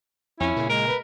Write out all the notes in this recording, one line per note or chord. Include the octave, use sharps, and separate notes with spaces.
F2 C#4 E4
A#2 C#3
G#3 A#4
B4